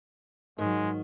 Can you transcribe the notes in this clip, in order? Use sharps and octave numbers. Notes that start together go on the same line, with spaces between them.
G#2 D#3 F#3 G#3